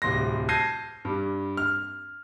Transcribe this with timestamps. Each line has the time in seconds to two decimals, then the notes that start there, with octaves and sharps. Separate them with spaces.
0.02 D1 C2 C6 A#6
0.49 A5 G6 G#6 A#6 C7 D#7
1.05 G2 G3
1.57 F6